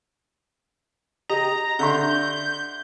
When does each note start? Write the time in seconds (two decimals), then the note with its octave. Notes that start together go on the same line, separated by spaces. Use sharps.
1.29 G4 D#5 A#5
1.79 D3 E5 C6 G6